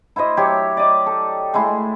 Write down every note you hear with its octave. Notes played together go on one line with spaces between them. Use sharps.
E4 F#4 C5 D#5
F#3 G4 C#5 E5
D5 D#5
A4
G#3 A3 E4 C6